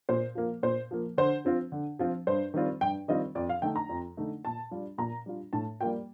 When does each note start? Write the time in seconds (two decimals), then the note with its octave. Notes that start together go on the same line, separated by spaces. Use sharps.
0.09 A#2 C5
0.35 F3 A#3
0.63 A#2 C5
0.91 F3 A#3
1.18 D3 C5
1.45 F3 C4 F4
1.72 D3
1.99 F3 C4 F4
2.27 G2 C5
2.54 D#3 G3 C4 F4
2.81 G2 G5
3.08 D#3 G3 C4 F4 D#5
3.35 F2 D5
3.49 F5
3.62 D3 A3 D#4 G5
3.76 A#5
3.89 F2
4.17 D3 A3 D#4
4.45 A#2 A5
4.71 G3 D4 F4
4.98 A#2 A#5
5.26 G3 D4 F4
5.53 A2 A5
5.81 G3 A#3 F4 G5